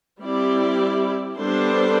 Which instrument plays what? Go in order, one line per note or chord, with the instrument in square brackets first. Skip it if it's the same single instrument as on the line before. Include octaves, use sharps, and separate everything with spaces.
[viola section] G3 C4 E4 G4 D5
G3 B3 D4 A4 C5